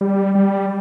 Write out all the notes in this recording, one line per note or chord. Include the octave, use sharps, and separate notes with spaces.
G3
G3